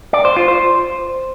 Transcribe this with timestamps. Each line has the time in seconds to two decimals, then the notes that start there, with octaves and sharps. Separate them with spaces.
0.13 D5
0.25 C5
0.37 F4
0.48 C5